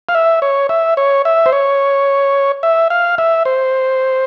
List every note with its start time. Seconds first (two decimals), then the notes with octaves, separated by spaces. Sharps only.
0.09 F5
0.15 E5
0.42 C#5
0.69 E5
0.97 C#5
1.25 E5
1.46 C5
1.53 C#5
2.63 E5
2.90 F5
3.18 E5
3.45 C5